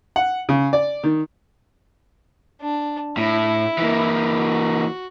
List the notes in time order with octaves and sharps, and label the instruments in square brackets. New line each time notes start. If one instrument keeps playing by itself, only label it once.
[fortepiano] F#5
C#3
D5
D#3
[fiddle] D4
[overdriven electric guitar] A2 [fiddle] E4
[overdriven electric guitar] E3 A#3
[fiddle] F#4